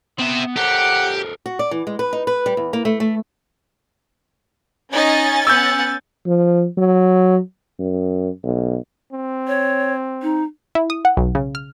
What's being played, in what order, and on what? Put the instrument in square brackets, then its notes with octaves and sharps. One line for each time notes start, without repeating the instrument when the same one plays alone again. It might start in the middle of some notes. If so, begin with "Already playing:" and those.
[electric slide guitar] B3 [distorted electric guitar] C4 E5
[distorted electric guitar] G4 [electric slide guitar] A4 A#4 C5 [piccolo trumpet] F#5
[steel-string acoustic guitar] F#4
D5
E3
G#3
B4
D#4
B4
G3
E2
A#3
A3
A3
[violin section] C#4 G#5 A6 [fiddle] D#4 D#5
[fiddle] B3 F#5 [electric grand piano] E6 G6
[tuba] F3
F#3
F#2
B1
[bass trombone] C4
[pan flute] C#5
D#4
[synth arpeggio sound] E4
D#6
F#5
B1
C#3
F6